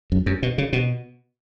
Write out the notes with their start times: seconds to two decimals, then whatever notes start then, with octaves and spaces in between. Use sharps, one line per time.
0.12 F#2
0.26 F#2
0.43 B2
0.58 C#3
0.73 B2